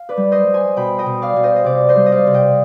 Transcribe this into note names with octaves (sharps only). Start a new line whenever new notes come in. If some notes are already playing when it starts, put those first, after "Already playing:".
Already playing: F5
B4 D5
G3
C5 D#5
G3
G#5 C6
B2 G5 B5
D#5 G5
B2
D5 F5
B2
C5 D#5
D#5
C3 D5 F5
C5 D#5
G3
D#5
D5 F5
C3
D#5 G5